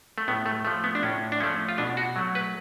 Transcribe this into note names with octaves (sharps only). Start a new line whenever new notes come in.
A3
A2 B3
A3
F3 A3
B3
D4
A2 C#4
D4
F3 A3 C#4
F4
B2 D4
F#4
F#3 A3
B4